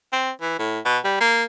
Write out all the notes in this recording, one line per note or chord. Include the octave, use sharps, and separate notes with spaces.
C4
E3
A2
B2
G3
A#3